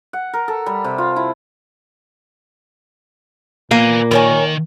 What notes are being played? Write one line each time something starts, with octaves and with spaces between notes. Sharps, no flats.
F#5
A#4
A4
G3
C3
F4
E4
A#2 A#3 B4 G#5
D#3 A#4 C#5 G#5